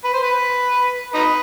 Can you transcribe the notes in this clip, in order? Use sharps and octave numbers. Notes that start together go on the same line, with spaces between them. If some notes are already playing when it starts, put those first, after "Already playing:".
B4
C5
B4
D#4 B4